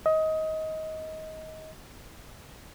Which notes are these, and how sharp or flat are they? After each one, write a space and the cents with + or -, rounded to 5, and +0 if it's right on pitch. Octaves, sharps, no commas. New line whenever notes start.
D#5 +20